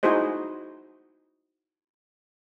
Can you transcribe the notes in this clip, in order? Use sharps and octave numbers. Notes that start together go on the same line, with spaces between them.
D#4 E4 F#4 G#4 C5 D#5